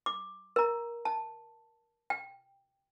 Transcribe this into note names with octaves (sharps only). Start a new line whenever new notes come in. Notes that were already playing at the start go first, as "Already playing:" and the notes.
D6
A#4 A#5
A5
G5